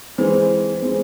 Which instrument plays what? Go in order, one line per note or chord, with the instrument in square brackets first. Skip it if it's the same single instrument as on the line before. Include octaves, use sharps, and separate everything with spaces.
[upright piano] E3 G#3 C4 [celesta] C5
[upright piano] E3 G#3 C4